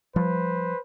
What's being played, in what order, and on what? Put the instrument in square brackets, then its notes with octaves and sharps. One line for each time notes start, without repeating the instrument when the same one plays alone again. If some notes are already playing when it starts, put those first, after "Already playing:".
[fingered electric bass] F3 G3 [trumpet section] B4 C5